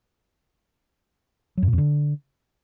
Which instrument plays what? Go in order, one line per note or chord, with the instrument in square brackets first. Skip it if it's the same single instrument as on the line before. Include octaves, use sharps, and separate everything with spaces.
[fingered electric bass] F#3
F#2
A#2
F2
D3